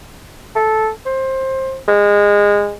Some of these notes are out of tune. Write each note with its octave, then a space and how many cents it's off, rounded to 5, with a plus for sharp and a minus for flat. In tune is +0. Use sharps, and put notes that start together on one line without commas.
A4 -10
C5 +20
G#3 -20